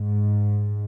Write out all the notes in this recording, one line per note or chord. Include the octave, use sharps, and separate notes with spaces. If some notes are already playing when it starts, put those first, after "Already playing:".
Already playing: G#2